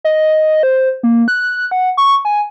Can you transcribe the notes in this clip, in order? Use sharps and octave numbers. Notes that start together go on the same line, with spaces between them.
D#5
C5
A#3
F#6
F#5
C#6
G#5